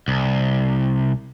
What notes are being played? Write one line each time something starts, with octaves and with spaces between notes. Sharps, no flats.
C2